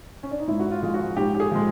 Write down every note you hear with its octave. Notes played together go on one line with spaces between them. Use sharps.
C#4
D4
D#4
G#2 E4
F#4
F4
F3 G#3
F#4
G#2 G4
G4
G#4
F3 G#3